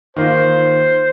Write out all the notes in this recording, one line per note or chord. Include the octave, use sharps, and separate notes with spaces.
D#3 A#3 F4 C5